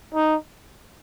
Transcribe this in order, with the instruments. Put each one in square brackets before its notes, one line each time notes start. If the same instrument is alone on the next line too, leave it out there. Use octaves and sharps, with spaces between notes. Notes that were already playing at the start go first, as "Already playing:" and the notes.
[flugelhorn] D#4